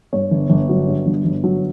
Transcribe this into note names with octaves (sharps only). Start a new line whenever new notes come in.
G2 C#5
G1
G1
F#3
G2
G1
G1
F#3